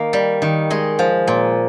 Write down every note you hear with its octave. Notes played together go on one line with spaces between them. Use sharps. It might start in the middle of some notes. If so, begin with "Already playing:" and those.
Already playing: D#3 A#3
G3
D#3
G#3 D#5
F3
A#2